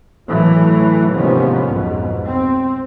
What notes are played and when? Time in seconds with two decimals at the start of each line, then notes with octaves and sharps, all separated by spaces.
0.27 A2 E3 F#3 A3
1.10 D#2 G#2 C3 F3 B3 C#4
1.68 B1 F2 G#2 B2
2.25 C4